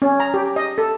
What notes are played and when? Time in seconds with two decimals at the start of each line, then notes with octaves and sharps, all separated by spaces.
0.02 C#4
0.20 A#5
0.34 G4
0.56 D#5
0.78 A4